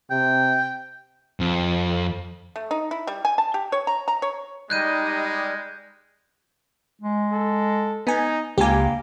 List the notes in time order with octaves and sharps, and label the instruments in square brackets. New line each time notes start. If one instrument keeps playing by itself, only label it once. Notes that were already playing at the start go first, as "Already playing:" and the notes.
[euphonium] C3 [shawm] G5
[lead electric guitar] F2
[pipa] A3
D#4
E4
G3
G#5
A5
G4
C#5
A#5
A#5
C#5
[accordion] G3 [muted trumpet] G#3 [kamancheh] D#4 D#5 [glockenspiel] F#6 G6 D#7
[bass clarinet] G#3
[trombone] A4
[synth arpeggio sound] B3 G#5 [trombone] D#4
[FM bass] C#2 [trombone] G2 [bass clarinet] A#3 [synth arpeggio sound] G4 G#5